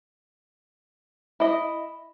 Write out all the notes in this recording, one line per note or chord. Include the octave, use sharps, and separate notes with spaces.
E4 D#5